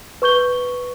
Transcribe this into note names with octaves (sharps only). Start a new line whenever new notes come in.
B4 C#6 G6 G7